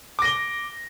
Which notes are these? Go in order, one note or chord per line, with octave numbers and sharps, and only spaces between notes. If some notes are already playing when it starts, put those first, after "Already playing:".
D6 A#6 G7